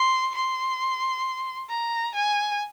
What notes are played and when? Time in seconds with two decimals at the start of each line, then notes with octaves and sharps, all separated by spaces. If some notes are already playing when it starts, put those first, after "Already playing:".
Already playing: C6
0.35 C6
1.70 A#5
2.15 G#5